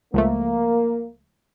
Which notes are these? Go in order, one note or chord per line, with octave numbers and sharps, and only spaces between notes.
C#2 F3 A3 A#3